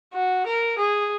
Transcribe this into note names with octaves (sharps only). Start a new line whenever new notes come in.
F#4
A#4
G#4